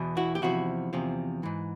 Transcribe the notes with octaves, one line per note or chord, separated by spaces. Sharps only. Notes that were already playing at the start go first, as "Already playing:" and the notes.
Already playing: E2 B2
E4 F#4
G4
E2 C3 F3 E4 F#4
E2 C3 F3
G#2 E3